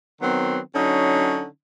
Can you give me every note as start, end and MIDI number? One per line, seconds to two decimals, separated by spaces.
0.22 0.59 51
0.22 0.59 54
0.22 0.59 59
0.22 0.59 60
0.75 1.45 50
0.75 1.45 54
0.75 1.45 61
0.75 1.45 63